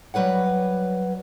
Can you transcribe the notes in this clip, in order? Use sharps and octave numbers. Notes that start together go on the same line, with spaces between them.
F#3 G3 B4 C#5 F#5